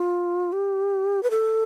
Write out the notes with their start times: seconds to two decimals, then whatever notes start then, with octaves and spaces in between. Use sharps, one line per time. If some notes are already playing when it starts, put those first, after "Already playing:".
Already playing: F4
0.53 G4
1.23 B4
1.30 A4